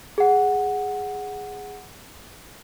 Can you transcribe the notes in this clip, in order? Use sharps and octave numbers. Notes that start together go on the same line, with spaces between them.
G#4 F#5